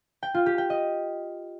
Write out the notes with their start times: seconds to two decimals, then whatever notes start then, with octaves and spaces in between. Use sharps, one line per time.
0.23 G5
0.34 F4
0.46 G4
0.58 G5
0.70 D#5